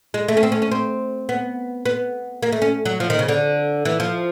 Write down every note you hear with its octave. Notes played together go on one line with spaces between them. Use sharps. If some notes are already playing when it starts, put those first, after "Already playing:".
G#3
A3
C#4
C4
C#4
C#4
C4
B3
B3
A#3
A3
C#4
F#3
F3
D#3
C#3
D3
E3
F3